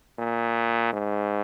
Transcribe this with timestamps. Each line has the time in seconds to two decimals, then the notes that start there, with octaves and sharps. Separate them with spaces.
0.19 A#2
0.93 G#2